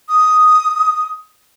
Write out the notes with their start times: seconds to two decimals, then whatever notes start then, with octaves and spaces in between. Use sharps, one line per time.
0.09 D#6